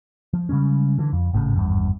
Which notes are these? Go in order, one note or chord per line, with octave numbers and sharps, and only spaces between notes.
F3
C#3 G3 G#3 C#4
D3 E3
F2
G#1 A2 C#3
G#1 E2 G2